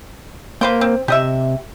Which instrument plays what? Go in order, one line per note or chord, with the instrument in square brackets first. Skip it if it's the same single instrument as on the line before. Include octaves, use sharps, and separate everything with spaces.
[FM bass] A#3 [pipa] B4 C5 G5
[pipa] C4
[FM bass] C3 [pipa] G4 D#5 E5